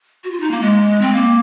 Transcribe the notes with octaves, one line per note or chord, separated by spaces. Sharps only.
F#4
F4
D#4
A#3
G#3
C4
A#3